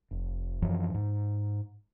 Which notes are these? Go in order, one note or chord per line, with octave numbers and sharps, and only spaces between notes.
F1
F#2 E3 F3
G#2